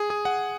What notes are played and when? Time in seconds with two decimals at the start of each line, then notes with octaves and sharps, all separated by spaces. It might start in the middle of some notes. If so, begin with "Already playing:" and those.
Already playing: G#4
0.10 G#4
0.25 F#5